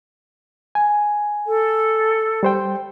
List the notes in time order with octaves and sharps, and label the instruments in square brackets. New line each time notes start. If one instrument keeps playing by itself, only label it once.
[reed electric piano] G#5
[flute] A4
[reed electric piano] G3 C5 G5